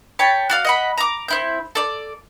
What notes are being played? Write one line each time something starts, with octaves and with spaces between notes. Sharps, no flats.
C#5 G5 A5 B5
F#4 D5 F5
D#5 F#5 B5
A#5 D6
C4 E4 G6
A4 D5